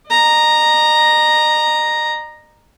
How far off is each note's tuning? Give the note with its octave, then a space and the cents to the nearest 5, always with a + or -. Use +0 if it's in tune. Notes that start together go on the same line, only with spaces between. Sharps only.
D#5 -45 A#5 +0